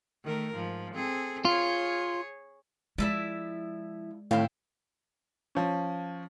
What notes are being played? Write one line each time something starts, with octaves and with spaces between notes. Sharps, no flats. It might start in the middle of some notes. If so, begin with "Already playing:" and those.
D#3 A3 A#4
G#2 F3
C4 G#4 A4
F4 G#4 C#5
F3 G#3 E4 D5 E5
A2 D#3 C4 E4 F5
F3 C#4